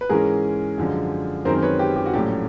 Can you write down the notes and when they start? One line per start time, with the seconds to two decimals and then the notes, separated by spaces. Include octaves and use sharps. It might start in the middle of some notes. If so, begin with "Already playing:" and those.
0.01 B4
0.09 G#2 E3 G#3 C#4 G#4 A#4
0.78 F#2 D3 F3 G#3
1.45 F#2 D#3 G#3 C4 A#4 C5
1.62 B4 C#5
1.79 G4
1.96 G4
2.06 F#4
2.13 A#1 A2 F#3 A3 C#4 G4